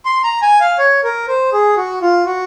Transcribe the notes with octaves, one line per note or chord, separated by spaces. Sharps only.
C6
A#5
G#5
F5
C#5
A#4
C5
G#4
F#4
F4
F#4